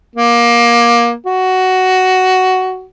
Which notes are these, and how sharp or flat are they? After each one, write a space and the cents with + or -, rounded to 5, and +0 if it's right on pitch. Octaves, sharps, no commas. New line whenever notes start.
A#3 +20
F#4 +10